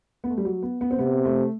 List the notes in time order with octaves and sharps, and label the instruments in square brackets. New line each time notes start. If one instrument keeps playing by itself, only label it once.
[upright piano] B3
A3
G3
F#3
B3
B3
C4
[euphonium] C3 [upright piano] B3
[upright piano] A3